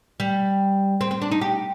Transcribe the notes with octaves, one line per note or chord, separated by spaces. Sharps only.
G3
C4
C4
D4
D#4
G4